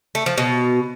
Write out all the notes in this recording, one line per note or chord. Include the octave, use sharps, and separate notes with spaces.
A3
F3
B2